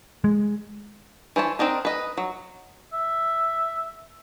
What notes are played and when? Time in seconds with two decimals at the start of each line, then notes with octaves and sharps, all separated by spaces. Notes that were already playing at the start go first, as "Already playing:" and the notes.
0.24 G#3
1.36 E3 C5 C#5 A5
1.59 C4 D4 D#4 A#4
1.85 B4 D#5
2.17 F#3
2.93 E5